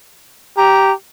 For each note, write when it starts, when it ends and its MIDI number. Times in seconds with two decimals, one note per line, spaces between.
0.57 0.93 67
0.57 0.92 82